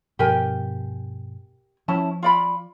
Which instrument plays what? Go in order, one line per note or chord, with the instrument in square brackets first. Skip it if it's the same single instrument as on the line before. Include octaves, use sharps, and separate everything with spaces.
[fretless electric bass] G2 B2 F3 [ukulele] G4 A#4 G#5
[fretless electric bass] F3 [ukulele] C#4 E4 A5
[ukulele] F4 D5 B5